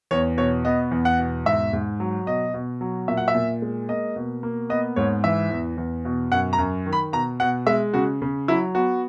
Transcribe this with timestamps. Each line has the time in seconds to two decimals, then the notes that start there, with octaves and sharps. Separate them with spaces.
0.11 E2 C#5
0.37 B2 C#5
0.65 B3 D#5
0.91 E2
1.05 F#5
1.19 B2
1.46 G#2 E5
1.73 G#2
2.00 F#3
2.26 B2 D#5
2.54 B2
2.81 F#3
3.08 A#2 E5
3.17 F#5
3.28 E5
3.35 A#2
3.62 G#3
3.89 A#3 D#5
4.16 B2
4.43 A#3
4.69 B3 D#5
4.96 G#2 C#5
5.24 E3 E5
5.50 E2
5.78 E2
6.05 B2
6.32 F#2 F#5
6.53 A#5
6.58 F#2
6.86 D#3
6.93 B5
7.13 B2 A#5
7.40 B2 F#5
7.67 G#3 E5
7.94 C#3 F#4
8.22 C#3
8.48 F#3 E4
8.75 B3 F#4